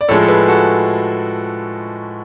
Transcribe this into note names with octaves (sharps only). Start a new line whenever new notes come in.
D5
A2 F3 G#3 A4 C#5
A4
G#4 B4
F#4 A4